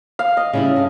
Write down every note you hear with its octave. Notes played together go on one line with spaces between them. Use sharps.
F5
D#5
C#3 G3 E4
G2 F5